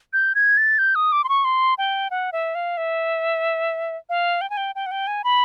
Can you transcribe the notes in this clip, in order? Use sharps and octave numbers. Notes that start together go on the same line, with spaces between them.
G6
G#6
A6
G6
D#6
D6
C6
C#6
C6
G5
F#5
E5
F5
E5
F5
G5
G#5
G5
G5
F#5
G5
G#5
B5